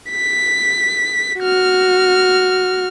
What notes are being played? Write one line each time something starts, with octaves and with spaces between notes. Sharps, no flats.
B6
F#4 F6